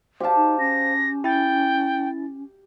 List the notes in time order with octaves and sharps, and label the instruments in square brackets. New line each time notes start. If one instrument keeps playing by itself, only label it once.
[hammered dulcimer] G4 A5 [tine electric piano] C5 F5
[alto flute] D#4
[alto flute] C#4 [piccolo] A#6
[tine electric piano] E4 A6 [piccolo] G5